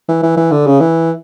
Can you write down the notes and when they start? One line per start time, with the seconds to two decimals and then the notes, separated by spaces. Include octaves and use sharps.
0.08 E3
0.23 E3
0.37 E3
0.51 D3
0.66 C#3
0.81 E3